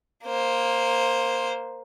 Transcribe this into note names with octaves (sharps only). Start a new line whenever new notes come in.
A#3 C5